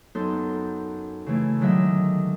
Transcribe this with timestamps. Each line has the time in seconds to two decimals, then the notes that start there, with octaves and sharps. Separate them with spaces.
0.15 F#2 B3 D#4 A4 C6 G6
1.27 C#3 E3 A3
1.60 D3 D#3 F#3 G#3 D#5 E5